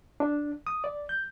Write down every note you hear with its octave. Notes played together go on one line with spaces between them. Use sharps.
D4
D#6
D5
G6